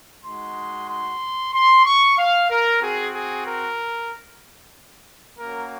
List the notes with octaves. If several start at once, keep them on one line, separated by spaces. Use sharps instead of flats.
G#3 D#4 F#4 C6
C6
C6
C#6
F5
A#4
C4 F#4 G#4
G#4
A#4
A#3 C#4 F#4 A#4